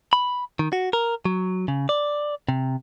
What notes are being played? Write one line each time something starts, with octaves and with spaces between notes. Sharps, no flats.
B5
D#3
F#4
A#4
F#3
C#3
D5
C3